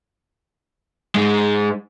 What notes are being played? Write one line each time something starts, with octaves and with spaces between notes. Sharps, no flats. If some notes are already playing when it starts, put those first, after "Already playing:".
G#2 G#3